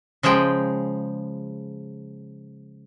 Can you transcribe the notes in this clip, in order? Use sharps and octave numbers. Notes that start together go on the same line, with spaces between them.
C#3 F3 G#3 G#4 G5